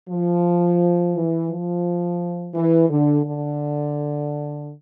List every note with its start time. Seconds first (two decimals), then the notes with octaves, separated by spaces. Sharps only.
0.10 F3
1.14 E3
1.50 F3
2.55 E3
2.90 D3
3.25 D3